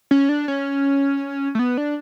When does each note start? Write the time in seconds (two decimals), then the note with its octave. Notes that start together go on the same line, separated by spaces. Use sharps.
0.11 C#4
0.29 D4
0.48 C#4
1.55 A3
1.59 B3
1.78 D4